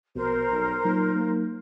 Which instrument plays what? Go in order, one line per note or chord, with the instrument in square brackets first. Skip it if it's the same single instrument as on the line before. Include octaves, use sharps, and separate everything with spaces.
[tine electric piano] A#1 [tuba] B2 [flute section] A#4 C5
[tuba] B1
[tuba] A#2 [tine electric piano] F#3 D#4
[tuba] A#3